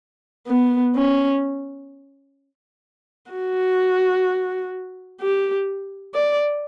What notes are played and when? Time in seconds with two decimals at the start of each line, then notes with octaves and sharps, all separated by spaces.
0.47 B3
0.95 C#4
3.31 F#4
5.21 G4
6.14 D5